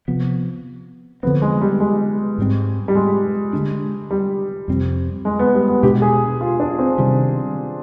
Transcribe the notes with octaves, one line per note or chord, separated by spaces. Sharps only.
C3 F3 B3
D3 F3 B3 C4
G#3
G3
G#3
G#2 G3 C4
G3
G#3
D3 G#3 D4
G3
F2 C3 G3 C4
G#3
B3
G3
B3
B2 G#3 D4 G4
G#4
F4
D4
C4
C3 D#3 G3